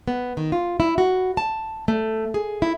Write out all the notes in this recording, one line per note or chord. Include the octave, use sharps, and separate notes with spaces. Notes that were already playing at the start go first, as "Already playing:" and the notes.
B3
D#3
F4
E4
F#4
A5
A3
G#4
E4